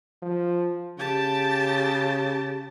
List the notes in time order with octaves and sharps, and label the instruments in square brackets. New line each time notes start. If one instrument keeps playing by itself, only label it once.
[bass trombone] F3
[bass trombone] C#3 [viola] G4 A5